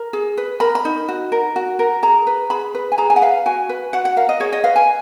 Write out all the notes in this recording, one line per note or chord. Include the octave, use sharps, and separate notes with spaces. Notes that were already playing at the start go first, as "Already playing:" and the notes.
Already playing: A#4
G#4
B4
A#4 B5
B5
D#4
F#4
A#4
F#4
A#4
G#4 A#5
B4
G#4 B5
B4
G#5
G#4 A#5
G#5
F#5
B4 F5
F#4 G#5
B4
F#4 F#5
F#5
A#4 F5
D#5
G#4 C#5
D#5
B4 F5
G#5